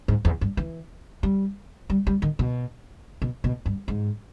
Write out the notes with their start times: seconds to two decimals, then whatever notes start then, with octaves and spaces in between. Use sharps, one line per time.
0.08 G#2
0.25 E2
0.41 G2
0.57 E3
1.23 G3
1.90 G3
2.07 G3
2.22 D#3
2.39 B2
3.22 B2
3.44 B2
3.66 G2
3.88 G#2